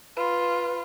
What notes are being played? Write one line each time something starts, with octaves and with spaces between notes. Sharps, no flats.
F4 B4